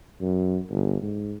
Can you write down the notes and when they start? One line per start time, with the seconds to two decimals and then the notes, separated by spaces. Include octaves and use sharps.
0.21 F#2
0.70 G1
1.02 G#2